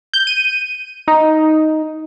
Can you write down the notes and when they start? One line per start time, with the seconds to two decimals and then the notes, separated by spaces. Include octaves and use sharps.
0.13 G6
0.27 D#7
1.08 D#4